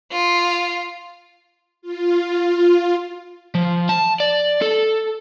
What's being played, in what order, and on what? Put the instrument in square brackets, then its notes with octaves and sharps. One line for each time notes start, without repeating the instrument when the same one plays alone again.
[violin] F4
[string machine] F4
[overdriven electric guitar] F3
A5
D5
A4